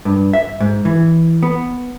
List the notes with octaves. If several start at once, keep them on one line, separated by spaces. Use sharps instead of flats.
G2
E5
G#2
E3
B3